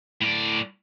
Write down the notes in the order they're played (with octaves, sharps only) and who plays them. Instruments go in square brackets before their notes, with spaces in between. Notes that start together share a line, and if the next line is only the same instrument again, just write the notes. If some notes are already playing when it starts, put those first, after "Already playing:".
[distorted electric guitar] A2 D5